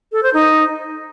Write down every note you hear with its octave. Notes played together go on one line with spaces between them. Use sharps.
A4
C5
D#4